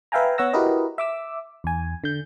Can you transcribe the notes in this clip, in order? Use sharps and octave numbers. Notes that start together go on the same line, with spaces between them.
B4 E5 F5 G5 G#5 A#5
B3 C#5 F#5 E6 A#6
E4 F#4 G4 A#4 B4 D#5
E5 D6 E6
E2 G#5
D3 G6